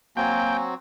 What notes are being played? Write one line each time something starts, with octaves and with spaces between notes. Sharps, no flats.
F#3 A#3 C4 F#4 G5 G#5